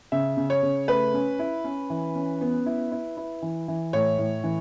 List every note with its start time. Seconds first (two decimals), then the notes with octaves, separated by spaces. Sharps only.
0.12 C#3 E5
0.37 C#3
0.50 C#5
0.63 C#3
0.88 A3 B4
1.14 C#4
1.39 E4
1.64 C#4
1.90 E3
2.15 C#4
2.41 B3
2.66 E4
2.92 E4
3.17 E4
3.42 E3
3.68 E3
3.93 A2 C#5
4.18 A2
4.44 E3